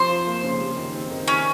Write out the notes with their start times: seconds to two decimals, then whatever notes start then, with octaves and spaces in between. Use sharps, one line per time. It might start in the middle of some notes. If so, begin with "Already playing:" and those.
Already playing: C3 F3 C5
0.09 F4
0.26 A#3
0.43 C#3
0.60 G3
0.77 D#3
0.94 C4
1.11 D#3
1.28 C3 C#4